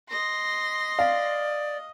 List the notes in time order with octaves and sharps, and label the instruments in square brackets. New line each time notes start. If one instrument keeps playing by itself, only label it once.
[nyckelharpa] D#5 [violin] C6 A#6
[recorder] D5 [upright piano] F5